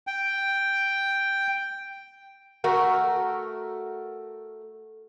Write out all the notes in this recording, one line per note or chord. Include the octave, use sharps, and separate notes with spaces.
G5
A3 F#4 A#4